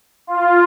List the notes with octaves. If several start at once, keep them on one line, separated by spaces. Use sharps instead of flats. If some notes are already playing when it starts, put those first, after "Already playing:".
F4